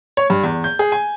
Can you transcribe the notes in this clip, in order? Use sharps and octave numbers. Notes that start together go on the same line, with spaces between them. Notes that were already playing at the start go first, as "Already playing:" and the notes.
C#5
G2
E2
G6
G#4
G#5